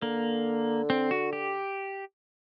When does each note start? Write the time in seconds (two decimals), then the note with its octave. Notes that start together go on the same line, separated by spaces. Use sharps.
0.02 D3 A#3
0.90 C4
1.11 F#4
1.33 G4